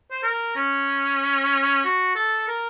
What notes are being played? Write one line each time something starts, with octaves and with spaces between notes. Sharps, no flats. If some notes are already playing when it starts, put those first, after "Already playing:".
C5
A#4
C#4
F#4
A4
A#4